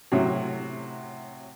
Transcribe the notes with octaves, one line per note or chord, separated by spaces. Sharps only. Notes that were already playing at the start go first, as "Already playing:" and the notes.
A2 C3 F#3